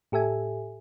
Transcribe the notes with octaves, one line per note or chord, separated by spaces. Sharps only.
A2 G4 A4 E5 G#5